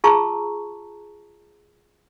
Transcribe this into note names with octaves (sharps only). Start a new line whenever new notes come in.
F4 G#4 A5 A#5 C#6 E6